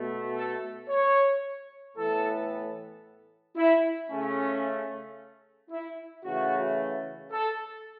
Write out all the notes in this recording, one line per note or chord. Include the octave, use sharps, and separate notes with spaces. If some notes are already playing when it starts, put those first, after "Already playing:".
Already playing: B2 A3
A4
C#5
A2 E3 B3 A4
E4
C#3 A3 C#4
E4
C#3 E3 A3 F#4
A4